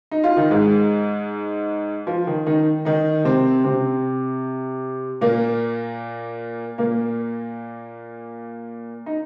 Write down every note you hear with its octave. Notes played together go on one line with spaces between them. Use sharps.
D#4
F4
D#3 D#4
G#2 G#3
F3
D#3
D#3 D#4
D#3 D#4
C3 C4
C3 C4
A#2 A#3
A#2 A#3
D#4